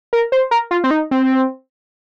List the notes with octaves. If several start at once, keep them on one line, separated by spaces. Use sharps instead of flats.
A#4
C5
A#4
F4
C4
D#4
C4